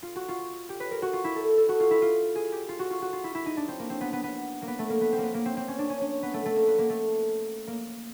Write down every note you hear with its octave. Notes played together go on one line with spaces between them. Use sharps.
F4
F#4
F4
G4
B4
A#4
F#4
F4
E4
A4
A4
F#4
F4
E4
F4
G#4
G4
F4
F#4
F4
F#4
F4
E4
E4
D#4
D4
C4
A#3
C4
B3
B3
B3
A#3
B3
A3
A#3
B3
C4
A#3 B3
A#3
C4
C4
C#4
D4
C#4
C#4
B3
A3
A3
A#3
B3
A#3
A3
A#3